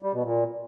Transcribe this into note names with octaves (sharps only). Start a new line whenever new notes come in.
G3
B2
A#2